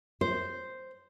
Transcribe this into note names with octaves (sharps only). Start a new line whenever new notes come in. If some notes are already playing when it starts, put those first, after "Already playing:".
C5